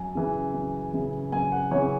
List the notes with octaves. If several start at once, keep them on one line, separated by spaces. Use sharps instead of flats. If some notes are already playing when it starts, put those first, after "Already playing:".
Already playing: F#2 G#5
C#3 E3
F#2
C#3 E3
F#2 G#5
F#5
C#3 E3 C#5